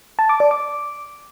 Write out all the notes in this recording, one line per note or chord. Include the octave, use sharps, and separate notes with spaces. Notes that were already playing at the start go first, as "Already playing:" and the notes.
A5
D6
D5
D6